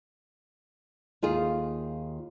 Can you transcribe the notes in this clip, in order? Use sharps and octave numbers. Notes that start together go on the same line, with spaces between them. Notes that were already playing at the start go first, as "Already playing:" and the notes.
D#2 F4 G#4